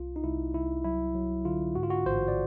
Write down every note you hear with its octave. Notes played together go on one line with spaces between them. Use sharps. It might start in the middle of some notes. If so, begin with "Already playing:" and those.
Already playing: C2 F4
D#4
C2 E4
C2 E4
F#3 E4
F#3
D3 F4
G#2 F#4
F4
F#4
A1 C5
D5